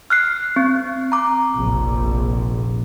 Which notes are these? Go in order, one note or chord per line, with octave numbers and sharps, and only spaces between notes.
F6 F#6 C7
C4
A#5 D6
F1 A#1